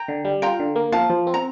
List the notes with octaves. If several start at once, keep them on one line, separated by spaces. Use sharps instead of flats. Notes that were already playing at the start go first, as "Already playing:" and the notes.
Already playing: G5 A#5
D3
G3
F4 G5 A#5
D3
A#3
F3 F5 A5
F3
C4
A#5